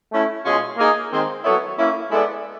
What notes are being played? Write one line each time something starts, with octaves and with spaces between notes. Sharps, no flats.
A3 C#4 E4
B2 G#3 C#4 F4
A#3 D#4 G#4
D#3 G#3 C4
F#3 B3 E4 A4 C#5
A#3 C#4 E4
G#3 B3 E4 A4 D5